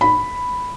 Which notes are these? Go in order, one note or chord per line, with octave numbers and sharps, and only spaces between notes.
B5